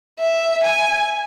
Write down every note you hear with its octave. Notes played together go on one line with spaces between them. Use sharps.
E5
G#5